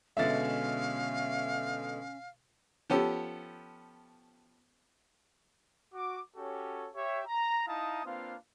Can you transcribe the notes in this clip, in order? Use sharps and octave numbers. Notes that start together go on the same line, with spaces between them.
B2 D3 G#3 C#4 E5 F5 A6
F3 B3 C#4 G4 A4
F#4 D6
C#4 F#4 G4 A4 C#5
G4 C#5 E5
A#5
D#4 E4 F5 A5 A#5 D#6
A#3 C4 D4 F4 B4 F5